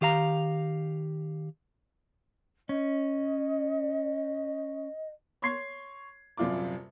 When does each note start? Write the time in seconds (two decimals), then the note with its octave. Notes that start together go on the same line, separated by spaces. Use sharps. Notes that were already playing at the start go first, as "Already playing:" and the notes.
0.01 D#3 G4 F5 A#5
2.69 C#4 D#5
5.42 C#5 C6 C#6 G#6 C7
6.37 D#1 F#2 C3 F4 D5 D6